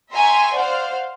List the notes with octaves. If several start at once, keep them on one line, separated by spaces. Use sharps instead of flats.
E5 G5 G#5 A#5 C6 C#6
C5 D5 F5 F#5